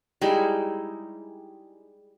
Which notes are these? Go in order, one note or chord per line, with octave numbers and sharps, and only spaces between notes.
G3 G#3 D#4 E4